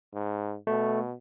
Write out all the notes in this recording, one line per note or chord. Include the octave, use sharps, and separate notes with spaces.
G#2
B2 A3